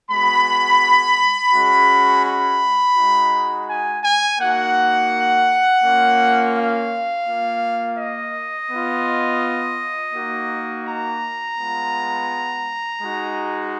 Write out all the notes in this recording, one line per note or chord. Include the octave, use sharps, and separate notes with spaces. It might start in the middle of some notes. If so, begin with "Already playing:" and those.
G#3 B3 F#4 B5
G#3 C#4 F#4
B5
G#3 D#4 F#4
G#5
G#5
A#3 D#4 F#4 F#5
A#3 C#4 F4
F5
A#3 F4
D#5
B3 F4
A#3 D#4 F#4
A#5
G#3 B3 F4
G#3 D#4 F#4